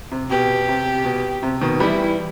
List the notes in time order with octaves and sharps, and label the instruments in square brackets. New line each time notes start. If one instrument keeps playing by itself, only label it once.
[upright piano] C3
[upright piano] B2 [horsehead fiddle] G4
[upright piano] C3
B2
C3
B2 D#3
[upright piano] E3 G3 [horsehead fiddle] E4